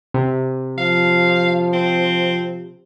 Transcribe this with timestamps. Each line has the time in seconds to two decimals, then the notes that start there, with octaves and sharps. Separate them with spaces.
0.14 C3
0.78 F3 F5
1.73 C4